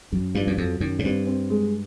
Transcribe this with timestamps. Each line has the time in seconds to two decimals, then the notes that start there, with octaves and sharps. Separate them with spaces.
0.12 F#2 C#4
0.34 G2 F3
0.47 F#2
0.57 F2 F#3
0.80 F#2 D#3
0.99 G#2
1.04 G2 C4
1.27 C4
1.50 G#3